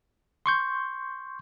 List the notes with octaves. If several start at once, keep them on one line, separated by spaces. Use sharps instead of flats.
C6 C#6 G6